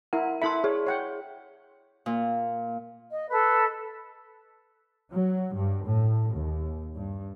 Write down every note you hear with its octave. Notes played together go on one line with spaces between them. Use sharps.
E4 A#4 F#5
E4 A4 E5 B5 C6
G#4 C#5
C#5 F#5 G5
A#2
D#5
A4 B4
F#3
G2
A2
D#2
G2